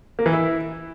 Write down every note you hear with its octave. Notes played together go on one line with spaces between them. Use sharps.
A#3
E3
E4